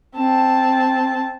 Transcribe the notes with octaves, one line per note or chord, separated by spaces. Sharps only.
C4 A5